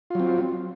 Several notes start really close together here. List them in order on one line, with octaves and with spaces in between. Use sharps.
F4 F#3 C4